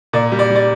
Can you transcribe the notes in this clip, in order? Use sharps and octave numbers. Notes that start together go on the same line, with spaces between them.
A#2 D5
G3
D5
G3
D5